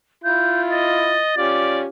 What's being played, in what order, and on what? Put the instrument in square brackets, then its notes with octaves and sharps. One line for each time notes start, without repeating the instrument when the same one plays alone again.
[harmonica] E4 F4 [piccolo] G6
[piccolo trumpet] D#5 [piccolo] A6
[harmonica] C#4 F4 G4 [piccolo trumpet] D5